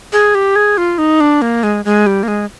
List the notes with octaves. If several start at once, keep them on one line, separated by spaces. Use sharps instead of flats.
G#4
G4
G#4
F4
D#4
D4
A#3
G#3
G#3
G3
A#3
G#3